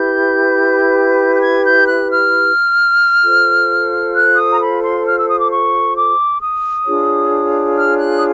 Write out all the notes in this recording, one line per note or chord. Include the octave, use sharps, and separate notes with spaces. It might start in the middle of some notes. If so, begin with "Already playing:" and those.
Already playing: E4 G4 B4 G6
G6
G#6
G6
F#6
F6
F4 A4 C5
F#6
D#6
A#5
B5
C6
F6
E6
D#6
D6
C#6
D6
D#6
D4 F4 G#4 C#5
F6
F#6
D#6